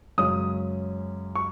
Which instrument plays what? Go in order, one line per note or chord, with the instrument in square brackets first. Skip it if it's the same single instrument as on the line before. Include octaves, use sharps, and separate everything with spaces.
[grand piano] F#2 C#3 G#3 C#4 D#6
C#6